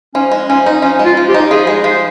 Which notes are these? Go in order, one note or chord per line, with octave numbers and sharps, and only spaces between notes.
F3 C#4
G#3
F3 C#4
D#4
F3 C#4
G#3
F4
F3
G4
D#4
F3 G#4
G#3
F3 C5